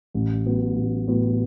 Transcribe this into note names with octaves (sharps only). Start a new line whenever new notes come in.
A1
A2 F#3 B3
A1
A2 F#3 B3